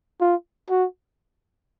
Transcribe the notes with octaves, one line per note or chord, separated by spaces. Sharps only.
F4
F#4